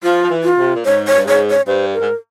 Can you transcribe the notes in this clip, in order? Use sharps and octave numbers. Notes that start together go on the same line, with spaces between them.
F3 F4
F3
E3
F4
C3
A#2
G#2 C#5
C#5
G2
G#2 C#5
C#5
G2 C5
A#4
G#2